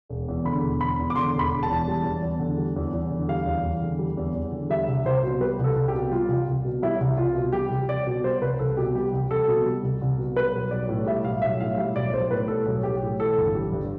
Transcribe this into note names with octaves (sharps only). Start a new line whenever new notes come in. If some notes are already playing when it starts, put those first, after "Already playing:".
E1
E2
D3 B5
E1
E1 B5
E2
D6
D3 C6
E1
B5
E1
A5
E2
G3
E2
E2
D3
G3
E2
E2
D3
G3 F5
E2
E2
D3
G3
E2
E2
D3
G3 E5
C2
C2 C5
B2
G3 B4
C2
A4
C2
G4
B2
G3 F4
C2
C2
B2
G3 E4
C2
C2 F4
B2
G3 G4
C2
C2 D5
B2
G3 C5
C2 B4
C2 A4
B2 G4
G3 G4
C2
C2 A4
B2
G3
C2
C2
B2
G3 B4
B1
B1 D5
A2
G3 E5
B1 F5
B1 E5
A2 F5
G3 E5
B1 D5
B1 C5
A2 B4
G3 A4
B1
B1 G4
A2
E3 A4
G1
G3
G2